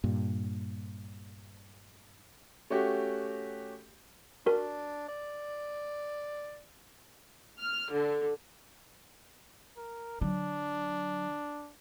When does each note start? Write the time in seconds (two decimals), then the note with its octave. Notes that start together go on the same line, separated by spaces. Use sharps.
0.04 G2 A#2
2.70 A3 C#4 F#4 G4
4.46 D4 F#4 A#4
5.09 D5
7.59 F6
7.92 D3
9.77 A#4
10.21 D3 F#3 D4